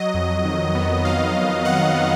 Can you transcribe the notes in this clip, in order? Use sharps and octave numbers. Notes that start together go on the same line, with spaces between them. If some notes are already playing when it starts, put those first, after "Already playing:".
Already playing: F#3 D#5
F2
D#3
B3
F#3 F5
F2
D#3 F#5
B3